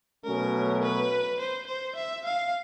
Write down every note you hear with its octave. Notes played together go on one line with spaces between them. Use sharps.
B2 F#3 A3 C#4 A#4
B4
C5
C5
E5
F5